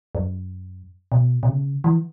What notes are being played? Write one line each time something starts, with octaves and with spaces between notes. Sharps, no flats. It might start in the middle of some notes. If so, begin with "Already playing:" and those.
F#2
B2
B2
C#3
E3